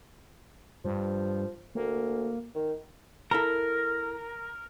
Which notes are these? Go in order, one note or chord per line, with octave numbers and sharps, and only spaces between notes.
G2 F3
D2 A#3
D#3
E4 A4 A#4 A#5